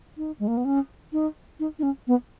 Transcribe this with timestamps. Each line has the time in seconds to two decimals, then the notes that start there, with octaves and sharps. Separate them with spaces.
0.17 D#4
0.39 G#3
0.48 A#3
0.57 B3
0.65 C#4
1.13 D#4
1.60 D#4
1.79 D#4
1.83 C#4
2.07 B3